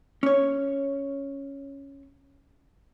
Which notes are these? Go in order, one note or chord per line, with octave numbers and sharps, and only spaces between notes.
C#4 C#5